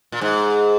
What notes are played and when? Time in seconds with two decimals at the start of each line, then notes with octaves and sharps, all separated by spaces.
0.12 A#2
0.21 G#2